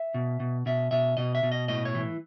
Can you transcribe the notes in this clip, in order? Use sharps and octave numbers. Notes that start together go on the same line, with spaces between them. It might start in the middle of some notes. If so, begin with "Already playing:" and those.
Already playing: E5
B2
B2
B2 E5
B2 E5
B2 D#5
E5
B2
D#5
A2 D#5
C#5
E3